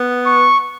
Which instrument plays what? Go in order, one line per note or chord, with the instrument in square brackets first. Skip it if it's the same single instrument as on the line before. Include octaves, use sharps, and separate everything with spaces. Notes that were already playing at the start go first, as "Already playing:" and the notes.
Already playing: [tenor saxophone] B3
[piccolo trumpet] C#6